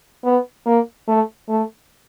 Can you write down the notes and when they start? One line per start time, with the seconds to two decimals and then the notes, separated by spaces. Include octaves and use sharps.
0.24 B3
0.66 A#3
1.08 A3
1.49 A3